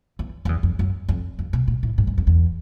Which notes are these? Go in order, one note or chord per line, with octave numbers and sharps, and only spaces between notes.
E2
F2
E2
F2
F#2
F2
F2
B2
A#2
A2
G#2
F#2
F2
E2